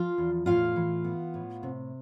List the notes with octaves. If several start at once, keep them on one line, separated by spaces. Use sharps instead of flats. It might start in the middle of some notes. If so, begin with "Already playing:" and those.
Already playing: F3 F4 F5
E2
A2 F4 F5
E3
B3
A2
C3